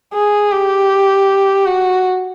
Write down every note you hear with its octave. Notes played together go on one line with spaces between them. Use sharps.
G#4
G4
F#4